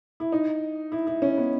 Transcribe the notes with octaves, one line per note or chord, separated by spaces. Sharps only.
E4
D#4
E4
E4
C#4
B3